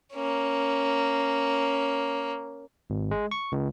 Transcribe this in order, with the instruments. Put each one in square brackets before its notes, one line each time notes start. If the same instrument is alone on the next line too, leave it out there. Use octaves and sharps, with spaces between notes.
[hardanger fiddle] A#3 C#4
[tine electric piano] G#1
G#3
C#6
C#2